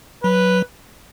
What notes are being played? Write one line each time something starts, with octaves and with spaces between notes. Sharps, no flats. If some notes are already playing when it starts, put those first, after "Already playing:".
F#3 B4